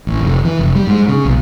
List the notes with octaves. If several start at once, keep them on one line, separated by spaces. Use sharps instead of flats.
A1
F1
E3
F1
G3
G#2
C#3
B1